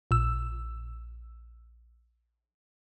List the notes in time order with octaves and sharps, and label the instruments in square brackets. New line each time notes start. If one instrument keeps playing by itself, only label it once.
[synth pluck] A#1 E6